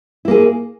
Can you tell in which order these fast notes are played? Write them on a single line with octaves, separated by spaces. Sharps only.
E4 A#3 G#4